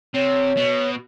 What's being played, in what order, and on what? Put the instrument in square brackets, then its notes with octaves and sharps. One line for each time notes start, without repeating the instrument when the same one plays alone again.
[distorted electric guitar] C3 [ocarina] C#5
[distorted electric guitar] B2